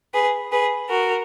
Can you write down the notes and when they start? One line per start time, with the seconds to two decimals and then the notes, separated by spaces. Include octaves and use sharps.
0.14 G#4 B4
0.52 G#4 B4
0.90 F#4 A#4